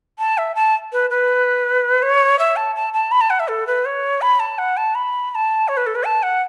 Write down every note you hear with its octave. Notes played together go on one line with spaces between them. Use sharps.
A5
E5
A5
B4
B4
C#5
E5
A5
A5
A5
B5
A5
F#5
E5
A4
B4
C#5
B5
A5
F#5
A5
B5
B5
A5
C#5
B4
A4
B4
A5
F#5